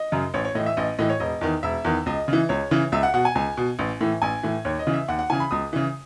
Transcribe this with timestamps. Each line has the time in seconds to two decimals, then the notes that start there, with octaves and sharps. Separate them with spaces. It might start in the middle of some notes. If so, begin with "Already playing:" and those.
Already playing: D#5
0.12 F#2 C#3
0.34 A1 C#5
0.45 C#5
0.55 A2 E3 D#5
0.66 E5
0.77 A1 D#5
0.99 A2 E3 D#5
1.10 C#5
1.20 E1 D#5
1.41 E2 D#3
1.63 E1 E5
1.85 E2 D#3
2.06 C#2 D#5
2.28 C#3 E3
2.49 C#2 C#5
2.71 C#3 E3
2.92 C#2 E5
3.03 F#5
3.14 B2 F#5
3.25 G#5
3.35 C#2 G#5
3.57 B2
3.79 A1
4.01 A2 E3
4.22 A1 G#5
4.43 A2 E3
4.65 D#2 C#5
4.79 D#5
4.87 C#3 E3
4.94 E5
5.08 D#2 F#5
5.19 F#5
5.30 C#3 E3 G#5
5.40 B5
5.51 C#2 D#6
5.73 C#3 E3